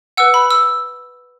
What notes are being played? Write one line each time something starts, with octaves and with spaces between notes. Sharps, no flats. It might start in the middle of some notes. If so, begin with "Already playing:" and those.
B4 F#5 E6
B5
E6